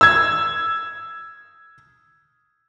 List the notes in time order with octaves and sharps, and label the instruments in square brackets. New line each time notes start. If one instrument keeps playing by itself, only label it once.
[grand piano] E6 G#6